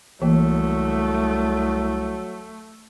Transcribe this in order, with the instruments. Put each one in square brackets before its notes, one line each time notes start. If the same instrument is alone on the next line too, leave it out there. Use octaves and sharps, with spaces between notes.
[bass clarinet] C2 [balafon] E3 A#3 [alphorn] F#3 [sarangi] A3